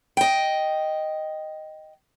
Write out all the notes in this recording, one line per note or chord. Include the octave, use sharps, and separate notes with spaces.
D#5 G5